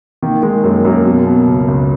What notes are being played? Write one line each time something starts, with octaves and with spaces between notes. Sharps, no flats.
D#3 A#3
D#3 G#3
F#2 A#3
F#2 A#3
B2
B2
C#2
C#2